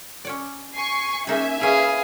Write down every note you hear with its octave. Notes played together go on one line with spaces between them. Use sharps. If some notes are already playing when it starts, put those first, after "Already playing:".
C#4 C#5 D5
G#5 C#6 C7
A#3 C#4 D#4 G#4 E5 G#5
C#4 E4 G#4 B4 F5